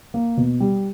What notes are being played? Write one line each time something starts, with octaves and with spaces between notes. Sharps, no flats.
A#3
B2
G3